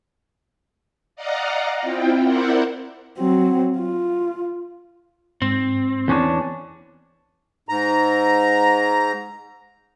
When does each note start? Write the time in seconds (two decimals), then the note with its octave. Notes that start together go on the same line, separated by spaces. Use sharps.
1.16 D5 D#5 F5 F#5 A#5
1.82 C4 E4 F4 G5
2.24 C4 E4 A#4 C5 D5 F#5
3.19 F#3 C4
3.78 F4
5.42 G#2 C4
6.08 E2 C#4 D4
7.69 G#2 A#5